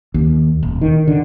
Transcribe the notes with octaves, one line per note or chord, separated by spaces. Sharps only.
D#2
D#1
D#3
D3